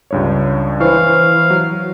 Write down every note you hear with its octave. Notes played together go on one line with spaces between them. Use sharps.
C#2 G2 C#5
E3 E4 C5 F5 C#6
F#3